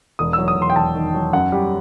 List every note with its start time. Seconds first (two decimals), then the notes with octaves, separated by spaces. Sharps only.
0.19 E1 D#6
0.33 F#3 E6
0.48 D#6
0.57 E1 C6
0.70 G5
0.75 E1 A5
0.95 D#3
1.14 F#3
1.33 F#2 F#5
1.52 G3